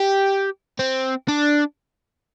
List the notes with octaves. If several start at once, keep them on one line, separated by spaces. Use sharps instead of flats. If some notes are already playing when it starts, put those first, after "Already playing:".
Already playing: G4
C4
D4